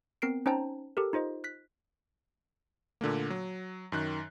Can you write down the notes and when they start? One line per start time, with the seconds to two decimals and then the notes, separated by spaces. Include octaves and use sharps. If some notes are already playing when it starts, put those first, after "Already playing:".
0.22 B3 C4 A#4 C7 D7
0.46 C#4 D#4 C5 G5 A5 A#5
0.97 G4 A4 A#4
1.13 D#4 F4 C5 D#5
1.44 F#6 B6
3.01 A#2 D3 A3 A#3
3.30 F#3
3.92 F#2 D#3 F#6